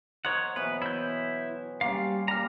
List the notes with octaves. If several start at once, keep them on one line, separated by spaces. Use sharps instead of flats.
A#4 C5 C#5 D#5 F#5
B2 E3 F#3 B4
E4 G6
G3 A#3 C#4 F5 C6
A#2 G3 A#5 F6